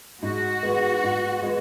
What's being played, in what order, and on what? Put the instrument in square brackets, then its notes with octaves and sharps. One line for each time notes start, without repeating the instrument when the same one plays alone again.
[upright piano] G#2 [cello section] F#4
[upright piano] G#3 B3
G#2
G#3 B3